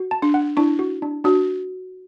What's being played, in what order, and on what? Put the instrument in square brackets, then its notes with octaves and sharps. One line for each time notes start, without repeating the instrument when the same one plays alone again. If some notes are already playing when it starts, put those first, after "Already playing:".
Already playing: [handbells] F#4
A5
[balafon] D4
[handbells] F#5
[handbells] D4 [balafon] E4
[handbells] F#4
D4
[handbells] D4 [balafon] F#4